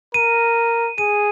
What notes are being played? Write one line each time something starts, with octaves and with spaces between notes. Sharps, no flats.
A#4 D#7
G#4 D#7